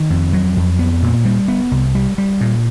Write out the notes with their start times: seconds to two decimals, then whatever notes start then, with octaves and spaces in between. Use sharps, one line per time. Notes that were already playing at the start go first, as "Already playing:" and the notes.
Already playing: D#3
0.10 F2
0.33 F#3
0.57 F2
0.79 B3
1.02 A#2
1.25 G3
1.48 B3
1.71 C2
1.95 G3
2.18 G3
2.41 A#2